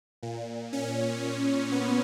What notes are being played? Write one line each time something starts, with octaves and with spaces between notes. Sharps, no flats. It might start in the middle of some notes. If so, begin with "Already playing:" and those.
A#2
C#4
A#2
B3